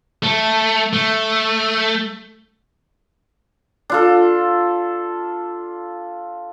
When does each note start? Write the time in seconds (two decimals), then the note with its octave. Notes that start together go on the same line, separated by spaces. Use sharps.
0.23 A3
0.93 A3
3.90 D4 F4 A4